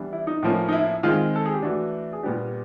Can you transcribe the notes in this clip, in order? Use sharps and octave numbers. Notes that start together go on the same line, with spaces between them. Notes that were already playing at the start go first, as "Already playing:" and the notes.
Already playing: E3 G3 B3 D4
E4
D#4
A2 F3 A#3 C#4
D#4
E4
D#3 G#3 C4 F4
A4
G#4
G4
E3 A3 D4 F#4
G#4
A#2 G3 B3 D4 G4